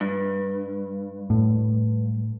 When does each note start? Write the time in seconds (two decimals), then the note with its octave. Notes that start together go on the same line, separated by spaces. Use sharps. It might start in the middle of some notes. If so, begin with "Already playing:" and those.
0.01 G2
1.30 A2